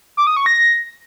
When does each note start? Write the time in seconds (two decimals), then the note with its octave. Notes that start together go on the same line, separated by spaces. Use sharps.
0.17 D6
0.27 D#6
0.37 C#6
0.46 A#6